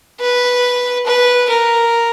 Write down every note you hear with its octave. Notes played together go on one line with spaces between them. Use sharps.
B4
B4
A#4